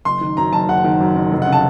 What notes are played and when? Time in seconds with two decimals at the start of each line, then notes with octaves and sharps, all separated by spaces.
0.05 F#1 C6
0.21 D#3
0.37 F#2 A#5
0.53 F#1 A5
0.68 F#1 F#5
0.84 D#3
1.00 F#2
1.16 F#1
1.32 F1
1.42 F#5
1.47 C#3
1.53 A5